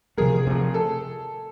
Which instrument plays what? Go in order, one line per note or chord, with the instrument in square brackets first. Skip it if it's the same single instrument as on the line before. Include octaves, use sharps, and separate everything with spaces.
[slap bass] C3 F3 A3 [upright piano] G#4 A#4
[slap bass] C3 F3 A3
[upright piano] A4